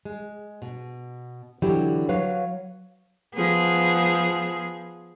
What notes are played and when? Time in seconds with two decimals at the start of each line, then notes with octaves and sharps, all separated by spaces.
0.05 G#3
0.62 B2
1.62 D3 E3 F#3 E4 G4
2.09 F#3 B4 C#5 F5
3.34 F3 B3 G#4